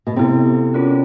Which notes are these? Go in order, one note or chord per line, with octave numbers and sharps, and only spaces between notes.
B2
C3 B3 E4 A4
C#4 F4 A#4 C#5